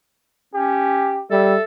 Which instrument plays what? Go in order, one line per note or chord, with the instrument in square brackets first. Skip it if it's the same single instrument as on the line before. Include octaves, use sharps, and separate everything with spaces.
[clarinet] C#4 [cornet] G4
[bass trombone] G3 [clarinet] A4 [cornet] E5